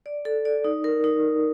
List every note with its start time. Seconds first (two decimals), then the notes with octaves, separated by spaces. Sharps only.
0.06 D5
0.25 A4
0.45 D5
0.64 D#4
0.84 A#4
1.04 D#4